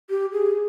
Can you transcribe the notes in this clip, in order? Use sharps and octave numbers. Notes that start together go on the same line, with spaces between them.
G4
G#4